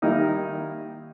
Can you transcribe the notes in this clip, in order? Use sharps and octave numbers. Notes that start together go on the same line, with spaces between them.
D#3 G3 A#3 D#4 E4